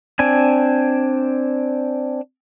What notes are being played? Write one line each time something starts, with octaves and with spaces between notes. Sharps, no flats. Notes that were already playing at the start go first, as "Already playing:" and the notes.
C4 D4 G#5